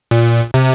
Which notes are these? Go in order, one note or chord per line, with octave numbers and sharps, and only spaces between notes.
A#2
C3